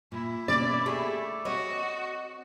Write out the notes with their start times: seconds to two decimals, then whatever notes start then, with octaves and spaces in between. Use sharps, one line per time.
0.12 A#2 E4
0.48 B2 A#3 C#4 D5
0.86 A3 G4 G#4
1.45 C4 F#4 C#5 D#5